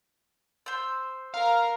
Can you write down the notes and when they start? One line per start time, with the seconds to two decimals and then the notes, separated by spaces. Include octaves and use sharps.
0.66 C5 E6
1.34 A#4 F5 A#5